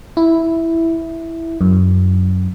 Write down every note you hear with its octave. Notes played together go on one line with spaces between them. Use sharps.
E4
F#2